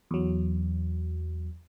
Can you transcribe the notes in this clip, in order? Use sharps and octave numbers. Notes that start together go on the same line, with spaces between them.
E2 F#3